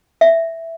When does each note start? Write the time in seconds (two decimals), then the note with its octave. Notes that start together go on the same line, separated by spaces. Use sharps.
0.21 E5